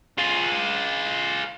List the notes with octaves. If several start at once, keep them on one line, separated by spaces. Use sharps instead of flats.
F4 G#4